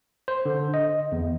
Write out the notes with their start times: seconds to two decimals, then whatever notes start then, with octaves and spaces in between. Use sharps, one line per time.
0.28 C5
0.45 D3
0.74 D#5
1.12 E2